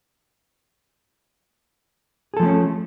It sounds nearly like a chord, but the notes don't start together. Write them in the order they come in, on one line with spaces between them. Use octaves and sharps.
G#4 A4 F3 A3 C#4